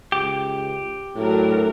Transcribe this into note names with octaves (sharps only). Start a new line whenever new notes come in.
C#2 G4
A2 F#3 D4 A#4